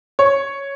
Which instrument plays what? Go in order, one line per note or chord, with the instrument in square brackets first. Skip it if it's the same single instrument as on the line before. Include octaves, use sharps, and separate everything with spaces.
[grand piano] C#5